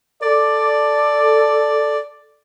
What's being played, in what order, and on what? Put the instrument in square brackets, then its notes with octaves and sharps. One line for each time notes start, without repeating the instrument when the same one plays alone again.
[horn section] A4 D5